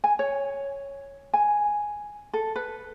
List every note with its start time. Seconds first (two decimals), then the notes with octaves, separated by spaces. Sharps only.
0.04 G#5
0.19 C#5
1.34 G#5
2.33 A4
2.56 B4